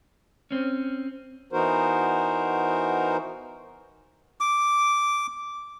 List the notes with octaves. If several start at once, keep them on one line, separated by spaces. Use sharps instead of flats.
C4 C#4
E3 B3 D#4 F#4 A#4 C5
D6